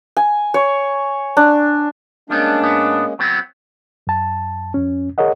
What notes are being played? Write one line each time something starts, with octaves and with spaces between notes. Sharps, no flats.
G#5
C#5
D4
G3 G#3 A#3 B3 C#4 D4
G#2 B3
F#3 B3 C4
F#2 A5
F2 C#4
G#4 A#4 C#5 D#5 F#5